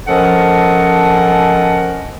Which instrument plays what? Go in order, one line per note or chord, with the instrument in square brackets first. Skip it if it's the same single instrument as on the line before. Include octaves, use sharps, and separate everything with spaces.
[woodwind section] F3 C#4 A4 A#4 D#5 F#5